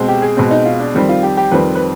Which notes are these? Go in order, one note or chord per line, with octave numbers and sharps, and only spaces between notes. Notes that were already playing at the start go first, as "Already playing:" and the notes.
Already playing: B2 G#3 C4
G4
G#4
B2 G#3 C4
D#4
F4
D4
F2 D#3 G3 C4
F4
G4
G4
F2 D#3 G3 C4 B4
B4